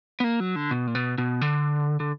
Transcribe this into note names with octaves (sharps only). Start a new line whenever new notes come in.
B3
A#3
F#3
D3
B2
A#2
B2
B2
D3
D3